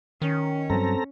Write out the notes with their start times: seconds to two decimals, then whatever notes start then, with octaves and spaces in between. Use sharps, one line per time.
0.22 D#3 C#4
0.70 G2 F#3 C4 A4 A#5